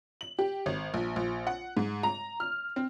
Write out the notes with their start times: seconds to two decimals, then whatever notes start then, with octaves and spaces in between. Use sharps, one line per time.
0.21 F#7
0.39 G4
0.66 G#1
0.94 A#1
1.16 A#1
1.47 F#5
1.77 G#2
2.03 A#5
2.40 F6
2.76 C4